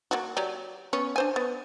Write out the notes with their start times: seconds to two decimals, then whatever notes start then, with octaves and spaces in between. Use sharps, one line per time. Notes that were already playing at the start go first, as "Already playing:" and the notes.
0.11 A#3 F4 F#4
0.36 F#3 G4 D5
0.93 B3 C#4 C#5
1.16 D4 C5 G#5
1.36 B3